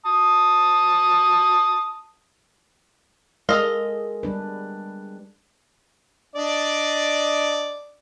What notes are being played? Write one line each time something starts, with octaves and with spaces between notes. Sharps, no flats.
A5 D#6
G#3 A4 A#4 D#5 F5 A#6
G3 D4 B4
D4 D5 D#5